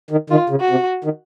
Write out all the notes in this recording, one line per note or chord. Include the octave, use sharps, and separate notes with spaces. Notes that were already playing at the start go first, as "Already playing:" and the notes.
D#3
D#3 F4
C#3
F#4
C3
D#3